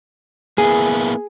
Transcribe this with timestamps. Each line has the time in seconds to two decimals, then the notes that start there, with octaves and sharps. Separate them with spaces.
0.58 A#3 B3 E4 G#4